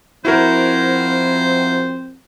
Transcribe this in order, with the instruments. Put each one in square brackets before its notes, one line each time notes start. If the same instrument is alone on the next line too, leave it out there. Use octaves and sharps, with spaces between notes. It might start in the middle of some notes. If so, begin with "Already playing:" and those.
[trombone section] F3 C4 [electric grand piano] E4 F#4 A#4 [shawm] C5